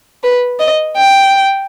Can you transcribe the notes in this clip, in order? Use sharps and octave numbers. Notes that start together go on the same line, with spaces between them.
B4
D#5
G5